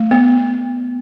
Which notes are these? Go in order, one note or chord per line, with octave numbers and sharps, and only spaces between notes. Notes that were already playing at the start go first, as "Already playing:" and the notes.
Already playing: A3
B3